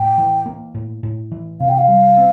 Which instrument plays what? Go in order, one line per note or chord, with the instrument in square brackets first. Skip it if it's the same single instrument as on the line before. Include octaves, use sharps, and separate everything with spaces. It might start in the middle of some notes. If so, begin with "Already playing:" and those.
Already playing: [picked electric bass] A2 [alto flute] G5
[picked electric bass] E3
A#3
A2
A2
E3
[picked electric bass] C3 [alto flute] F5
[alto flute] G5
F5
[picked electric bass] G3
C4